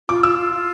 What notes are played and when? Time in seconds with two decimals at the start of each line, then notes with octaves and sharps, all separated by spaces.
0.09 F4 D6
0.23 F4 E6
0.38 F4
0.53 F4